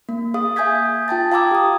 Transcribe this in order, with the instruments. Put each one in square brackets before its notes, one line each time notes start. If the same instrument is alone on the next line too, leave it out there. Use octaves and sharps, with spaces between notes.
[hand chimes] A#3
G#4 F5 D#6
E5 G#5 D#6 G6 G#6 B6
F4 G5 A5 A6
F5 A5 A#5 D6 E6 G#6
G4 D#6